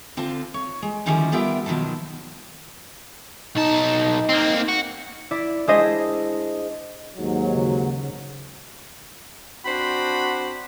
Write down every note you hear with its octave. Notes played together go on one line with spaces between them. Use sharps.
D3 C4 F4 A5
C#5
G#3
D3 D#3 F3 G3 C#4 E4
G3 B3 F4 A#4 E5 G5
B2 D#3 F3 F#3 A5
B1 D#4 A5
A#3 C4
F#4
E4 D5
G#3 D4 E4 G#4 C5 D#5
D#2 G#2 F#3
C#3
C4 D4 F#4 C5 F#5 B5